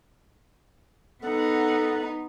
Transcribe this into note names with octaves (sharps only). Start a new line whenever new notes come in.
B3 D#4 A4 F#5